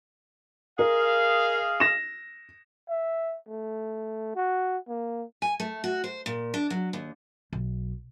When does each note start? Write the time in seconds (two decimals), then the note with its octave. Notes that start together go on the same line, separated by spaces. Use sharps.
0.79 G#4 A#4 D#5 F5
1.80 A#6 E7
2.89 E5
3.48 A3
4.36 F#4
4.88 A#3
5.42 G#5
5.60 A3
5.84 F#4
6.04 C5
6.26 A#2
6.54 D4
6.70 F#3
6.93 D#2
7.53 B1